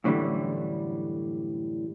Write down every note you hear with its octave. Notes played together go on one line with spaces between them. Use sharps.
F#2 A2 D3 E3 G3